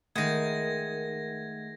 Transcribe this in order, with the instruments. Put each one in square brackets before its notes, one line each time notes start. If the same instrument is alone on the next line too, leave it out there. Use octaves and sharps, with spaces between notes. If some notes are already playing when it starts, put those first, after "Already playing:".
[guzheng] D#3 G#3 [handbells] A3 F#5 [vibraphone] A#4 [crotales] G#6 A#6